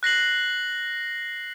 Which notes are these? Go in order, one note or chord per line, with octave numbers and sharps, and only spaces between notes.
F#6 A#6 C7 F#7